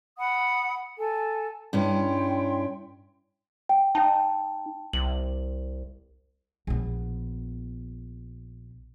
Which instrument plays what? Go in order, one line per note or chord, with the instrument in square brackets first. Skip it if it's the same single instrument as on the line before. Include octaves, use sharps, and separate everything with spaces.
[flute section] F#5 B5 D#6
A4 G#5
[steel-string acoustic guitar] G2 C#4 E4 [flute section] G5 C6
[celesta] G5
[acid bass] D#4 [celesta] G5 A5
[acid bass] C2 [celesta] F#7
[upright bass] A#1 B3